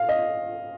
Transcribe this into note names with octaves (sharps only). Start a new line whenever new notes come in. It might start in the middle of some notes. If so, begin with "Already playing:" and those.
Already playing: F5
D#5